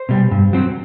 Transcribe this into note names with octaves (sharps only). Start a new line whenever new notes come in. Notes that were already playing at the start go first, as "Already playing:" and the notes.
Already playing: C5
B2 G3
G2
F#3 C4